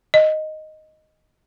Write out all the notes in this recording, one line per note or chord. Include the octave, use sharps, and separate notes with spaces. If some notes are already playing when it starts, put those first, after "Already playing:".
D#5